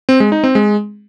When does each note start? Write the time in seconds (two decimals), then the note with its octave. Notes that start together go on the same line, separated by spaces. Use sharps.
0.09 C4
0.20 G#3
0.32 D#4
0.44 C4
0.55 G#3